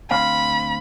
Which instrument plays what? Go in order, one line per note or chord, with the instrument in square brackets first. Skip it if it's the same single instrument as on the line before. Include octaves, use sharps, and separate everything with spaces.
[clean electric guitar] D2 C4 F5 [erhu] B5